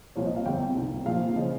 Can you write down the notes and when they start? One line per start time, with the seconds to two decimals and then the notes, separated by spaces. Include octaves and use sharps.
0.16 C2 A#2 F3 C#5
0.26 D#5
0.36 F5
0.46 G1 F2 C3 G5
0.76 C2 C3 D#3
1.06 A#1 A#2 F3 F5
1.36 C#3 F3 D#5